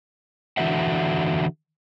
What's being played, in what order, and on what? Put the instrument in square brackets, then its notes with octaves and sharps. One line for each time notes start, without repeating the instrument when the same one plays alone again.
[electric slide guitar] D3 E3 F#4 A4 E5 F#5